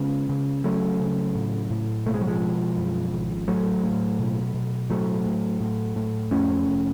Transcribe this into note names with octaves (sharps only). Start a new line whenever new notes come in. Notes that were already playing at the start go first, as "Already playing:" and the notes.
Already playing: C#3 G#3 B3
C#3
C#3 F#3 A3
C#3
A2
A2
B2 A3
G#3
F#3
F3 G#3
B2
F#2
G#1
A2 F#3 A3
A2
B2
B2
A2 F#3 A3
A2
A2
A2
F2 A3 C#4
F1